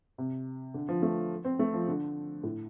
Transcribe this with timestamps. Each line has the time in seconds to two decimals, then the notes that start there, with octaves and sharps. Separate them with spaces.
0.18 C3
0.74 D3
0.89 F3
1.02 A3
1.45 C4
1.59 A3
1.74 F3
1.88 D3
2.43 A2